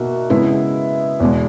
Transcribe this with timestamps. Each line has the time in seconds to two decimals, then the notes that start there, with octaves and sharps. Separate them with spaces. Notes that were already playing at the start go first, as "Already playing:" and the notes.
Already playing: B2 A#3 D#4 F#4 E5
0.30 C#3 G#3 B3 E4 E5
1.20 E2 B2 G#3